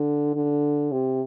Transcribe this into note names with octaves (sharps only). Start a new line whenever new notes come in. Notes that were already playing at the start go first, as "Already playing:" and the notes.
Already playing: D3
D3
C3